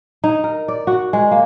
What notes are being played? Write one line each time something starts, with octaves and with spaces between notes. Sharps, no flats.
D#4
A#4
D5
F#4
G#3
A#3